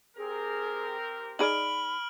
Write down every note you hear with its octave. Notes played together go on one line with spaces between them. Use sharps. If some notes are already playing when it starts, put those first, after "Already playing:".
C4 G4 G#4 A#4
D#4 G#4 D5 B5 F6 D7 F#7